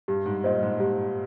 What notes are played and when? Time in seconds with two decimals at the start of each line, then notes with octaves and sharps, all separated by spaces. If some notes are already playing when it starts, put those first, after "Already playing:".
0.08 G2 G4
0.26 G#2
0.44 A#2 C5 D#5
0.63 G#2
0.80 G#2 G4